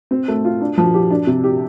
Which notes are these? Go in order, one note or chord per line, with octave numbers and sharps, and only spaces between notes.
C4
A3
F4
D4
F3
G4
D4
C3
G4